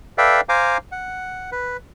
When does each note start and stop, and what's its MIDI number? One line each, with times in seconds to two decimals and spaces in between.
0.18 0.41 69
0.18 0.41 71
0.18 0.41 74
0.18 0.41 76
0.18 0.41 77
0.18 0.41 79
0.49 0.77 72
0.49 0.77 77
0.49 0.77 80
0.49 0.77 82
0.49 0.77 86
0.92 1.50 78
1.52 1.77 71